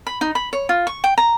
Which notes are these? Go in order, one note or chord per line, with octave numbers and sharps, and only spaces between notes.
B5
D#4
B5
C#5
F4
C#6
G5
A#5